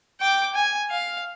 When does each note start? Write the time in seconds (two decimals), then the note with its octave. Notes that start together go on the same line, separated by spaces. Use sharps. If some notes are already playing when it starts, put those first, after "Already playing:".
0.20 G5 D6
0.55 G#5
0.91 F5